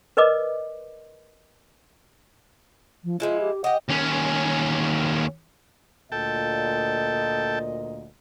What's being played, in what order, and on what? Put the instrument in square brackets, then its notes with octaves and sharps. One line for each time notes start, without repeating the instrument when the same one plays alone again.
[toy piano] A#4 B4 D5 D#5 D6
[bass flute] F3
[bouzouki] F3 G#3 E4 [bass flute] F4
[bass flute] G4
[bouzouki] G4 D#5 [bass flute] F#5
[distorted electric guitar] D#2 C#4
[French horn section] D2 A#2 D#5 [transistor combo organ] A4 G5 A5